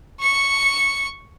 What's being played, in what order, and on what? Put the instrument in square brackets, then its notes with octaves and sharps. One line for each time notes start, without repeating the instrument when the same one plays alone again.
[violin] C#6 C#7